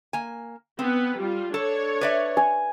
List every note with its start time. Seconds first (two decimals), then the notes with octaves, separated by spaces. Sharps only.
0.13 A#3 G#5
0.79 B3 C4 B4
1.18 G3 F4
1.54 D4 A4 C#5
2.01 B4 D5 E5
2.37 G#5